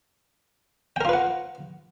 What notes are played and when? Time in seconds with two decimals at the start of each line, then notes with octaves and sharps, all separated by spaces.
0.96 G5
1.01 A#4
1.05 F4
1.09 B4
1.13 F#5